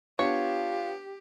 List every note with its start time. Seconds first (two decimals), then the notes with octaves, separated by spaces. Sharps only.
0.19 B3 D4 F4 G4 C#5